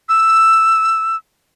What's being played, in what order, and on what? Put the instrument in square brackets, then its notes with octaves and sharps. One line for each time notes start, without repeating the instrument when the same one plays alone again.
[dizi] E6